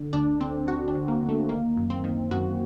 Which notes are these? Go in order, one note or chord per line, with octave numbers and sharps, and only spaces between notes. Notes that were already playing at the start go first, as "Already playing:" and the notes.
Already playing: D3
D2 D4
D3 C4
D2 F#4
D4
D3
A#3
D2
A3
D#3 A#3
F#2
C4
D#3
F#2 F#4